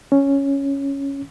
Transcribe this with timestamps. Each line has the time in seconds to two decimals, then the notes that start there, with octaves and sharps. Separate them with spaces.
0.12 C#4